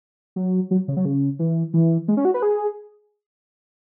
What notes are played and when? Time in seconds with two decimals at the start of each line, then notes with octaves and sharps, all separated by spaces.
0.36 F#3
0.71 F#3
0.88 C#3
0.97 F#3
1.05 C#3
1.39 E3
1.74 E3
2.08 G#3
2.17 C#4
2.25 F#4
2.34 B4
2.42 G#4